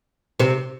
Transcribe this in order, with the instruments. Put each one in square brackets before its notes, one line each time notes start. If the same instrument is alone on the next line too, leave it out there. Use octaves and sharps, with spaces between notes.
[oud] C3 C4